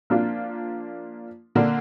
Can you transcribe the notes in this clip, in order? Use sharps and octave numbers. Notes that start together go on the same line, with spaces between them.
F3 A#3 D4 F4
D3 A#3 D4